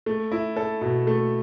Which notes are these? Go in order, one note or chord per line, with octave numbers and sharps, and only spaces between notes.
A3
E4
A4
B2
A3